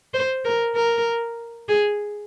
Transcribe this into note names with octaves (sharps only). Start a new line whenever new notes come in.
C5
A#4
A#4
G#4